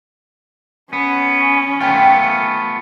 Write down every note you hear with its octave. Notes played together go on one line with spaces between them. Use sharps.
B3 C#4
A3 B3 F4 G5 G#5 B5